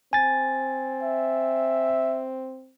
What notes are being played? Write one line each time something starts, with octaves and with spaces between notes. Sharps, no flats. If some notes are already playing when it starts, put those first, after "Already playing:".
C4 G#5 A6
E5